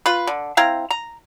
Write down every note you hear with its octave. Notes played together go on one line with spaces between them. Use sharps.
F4 B4
D3
C4 E4 F5 A#5
A#5